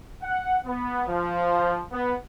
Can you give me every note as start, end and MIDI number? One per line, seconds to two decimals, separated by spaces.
0.23 0.58 78
0.66 1.02 59
1.07 1.82 53
1.92 2.13 59